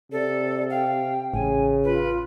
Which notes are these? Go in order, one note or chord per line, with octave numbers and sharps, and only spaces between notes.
C3 A4 D5
F5 G5
A1 C#3 G#5
F4 B4